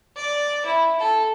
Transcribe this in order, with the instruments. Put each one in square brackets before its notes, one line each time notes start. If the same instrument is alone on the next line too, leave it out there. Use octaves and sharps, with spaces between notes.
[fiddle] D5
E4
A4